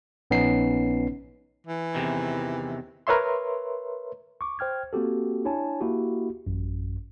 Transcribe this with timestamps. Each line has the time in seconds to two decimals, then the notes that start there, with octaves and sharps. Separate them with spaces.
0.31 A#1 B3 C#4 D#4 C7
1.67 E3
1.95 E2 C3 D#3
3.07 A#4 B4 C#5 E5 C6
4.41 C#6 D6
4.59 C5 G5 F6 G#6
4.93 A#3 C4 F#4 G4 A4
5.45 D4 E4 C#5 G#5 A5
5.80 A#3 E4 F#4 G4
6.47 A1 F#2